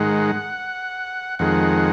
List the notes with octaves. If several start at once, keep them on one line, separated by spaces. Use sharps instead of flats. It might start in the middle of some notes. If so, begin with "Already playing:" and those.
Already playing: G#2 D#3 G#3 F#5
F2 D#3 G#3 F#5